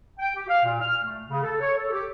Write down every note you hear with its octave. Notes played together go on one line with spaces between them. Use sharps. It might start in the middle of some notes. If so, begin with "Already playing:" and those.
G5
G4
F5
A#2
F6
A3
C#3
A4
C#5
A4
G4